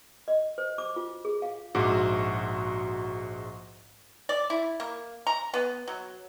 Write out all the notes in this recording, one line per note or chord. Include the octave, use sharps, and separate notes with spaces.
D#5
C5
D6
F4
G#4
F5
A#1 G#2 F#4 D6
D5
E4
A#3
A#5
B3
F#3